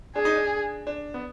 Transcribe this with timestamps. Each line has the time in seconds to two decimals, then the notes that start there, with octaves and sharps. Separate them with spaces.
0.15 D4 G#4
0.25 D#4
0.36 D4
0.87 D4
1.14 B3